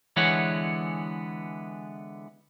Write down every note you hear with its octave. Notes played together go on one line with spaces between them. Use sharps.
D3 E3 G#3 B3 C#5 F#5